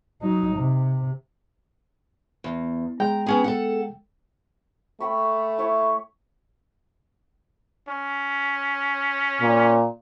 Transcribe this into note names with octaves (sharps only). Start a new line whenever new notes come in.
F#3 D#4
C3
E2
G#3 G5 A#5
B3 C#4 G#4
A4 F#5
A3 G5 B5 C#6
E4 C#5 C#6
C#4
A#2